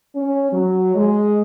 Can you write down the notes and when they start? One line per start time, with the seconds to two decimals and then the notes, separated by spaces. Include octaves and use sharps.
0.14 C#4
0.51 F#3
0.95 G#3